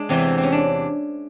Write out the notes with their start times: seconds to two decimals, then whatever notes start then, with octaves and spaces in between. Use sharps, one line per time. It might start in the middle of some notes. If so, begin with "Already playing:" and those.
Already playing: G#3 D4
0.09 E2 C3 E3 C4
0.38 C4
0.43 C#4
0.52 D4